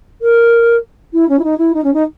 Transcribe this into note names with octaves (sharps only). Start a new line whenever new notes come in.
A#4
E4
C#4
E4
D#4
E4
D#4
C#4
D#4